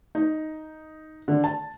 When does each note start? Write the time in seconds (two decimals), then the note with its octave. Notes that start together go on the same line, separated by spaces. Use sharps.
0.15 D#4
1.28 D3
1.44 A5